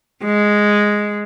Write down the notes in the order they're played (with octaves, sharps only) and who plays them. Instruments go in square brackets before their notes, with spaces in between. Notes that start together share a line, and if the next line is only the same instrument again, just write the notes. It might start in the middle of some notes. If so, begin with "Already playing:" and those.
[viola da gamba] G#3